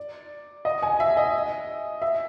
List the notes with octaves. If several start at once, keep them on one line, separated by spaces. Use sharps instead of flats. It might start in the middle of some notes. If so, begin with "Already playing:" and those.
Already playing: D5
D#5
G#5
E5
D#5
E5